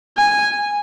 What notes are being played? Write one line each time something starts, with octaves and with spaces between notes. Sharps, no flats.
G#5